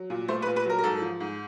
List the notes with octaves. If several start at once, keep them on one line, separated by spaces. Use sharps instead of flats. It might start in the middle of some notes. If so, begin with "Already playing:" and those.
Already playing: F#3
A#2
A3 C5
B4
A#2
B4
F#3 A#4
A#4
G#2 A4
F3
G#2